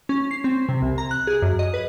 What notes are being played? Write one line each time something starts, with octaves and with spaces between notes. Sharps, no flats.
C#4
C7
C4
C3
C2
A#5
F#6
G#4
F#2
D#5
B4